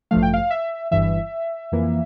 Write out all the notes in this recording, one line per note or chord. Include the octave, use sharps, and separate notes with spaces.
A1 G2 F3 A3 F5
G5
F5
E5
G1 G2 E3 E5
F2 E3 A#3